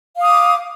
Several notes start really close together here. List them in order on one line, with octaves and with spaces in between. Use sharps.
F5 D#6 D6